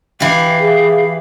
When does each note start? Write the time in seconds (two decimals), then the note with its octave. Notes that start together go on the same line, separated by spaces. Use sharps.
0.20 E3 G4 F5
0.60 G#4